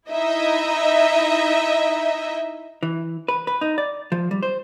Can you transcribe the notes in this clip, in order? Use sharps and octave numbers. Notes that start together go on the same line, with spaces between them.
D#4 E4 D#5 E5
E3
B4
B4
D#4
D5
F3
G3
C5